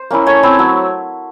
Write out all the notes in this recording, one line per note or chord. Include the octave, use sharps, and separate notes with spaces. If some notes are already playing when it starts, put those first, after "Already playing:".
Already playing: C5
A#3 C#4 E4
A3 C#5
C4 E4
F#3